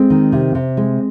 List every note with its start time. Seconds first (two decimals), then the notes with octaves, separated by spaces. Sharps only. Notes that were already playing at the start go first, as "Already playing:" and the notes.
Already playing: G#3 C4
0.10 D#3
0.32 C3
0.55 C3
0.77 G#3